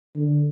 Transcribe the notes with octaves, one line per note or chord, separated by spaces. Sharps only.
D3